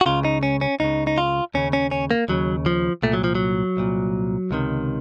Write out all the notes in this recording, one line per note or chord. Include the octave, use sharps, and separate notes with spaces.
F#4
C#2 C#3 F4
D#4
C#4
C#4
C#2 C#3 D#4
D#4
F4
D#2 C#3 C#4
C#4
C#4
A#3
D#2 C#3 F#3
F3
C2 A#2 A3
F#3
F3
F#3
C2 A#2
C#2 C3 D#3